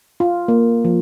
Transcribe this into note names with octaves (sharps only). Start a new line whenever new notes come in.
F4
A#3
F3